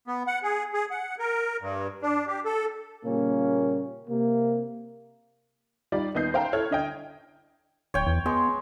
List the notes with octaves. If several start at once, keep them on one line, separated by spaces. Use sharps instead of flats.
B3
F#5
G#4
G#4
F#5
A#4
G2
D4
G4
A4
A#2 C#3 G3 A#3 C#4
C3 A#3
G3 D#4 F4 D5
D#2 B3 D#5 G6 C7
C5 F5 G5 A5 A#5
E4 A4 C#5 F6 G#6
D3 D#5 G5
D1 C#5 G5
E2
G#3 B3